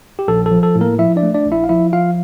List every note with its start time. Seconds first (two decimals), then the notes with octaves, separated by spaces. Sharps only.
0.19 G4
0.28 A#1 A4
0.46 A4
0.51 F3
0.63 A4
0.75 A2
0.81 A#3 A#4
0.98 F3 E4 E5
1.16 D4 D5
1.23 A3
1.34 D4 D5
1.46 A#1
1.52 E4 E5
1.64 F5
1.69 F3 E4 E5
1.93 F3 F4 F5